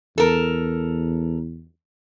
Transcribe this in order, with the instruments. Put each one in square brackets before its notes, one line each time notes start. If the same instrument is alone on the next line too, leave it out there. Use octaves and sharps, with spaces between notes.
[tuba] E2 [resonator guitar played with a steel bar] A4 A#4